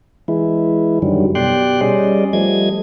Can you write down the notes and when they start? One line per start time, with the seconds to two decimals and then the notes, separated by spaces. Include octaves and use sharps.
0.28 E3 G#3 E4
1.02 F#2 D3 D#3 F#3 G3
1.35 B2 G4 D5 G5 C6 F#6
1.81 G3 C#4 G#4 D5 D#5
2.33 F3 G3 A3 D#5 G#6